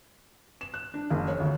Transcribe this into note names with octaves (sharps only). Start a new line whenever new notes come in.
E7
F#6
D4
F#1
C#5
D2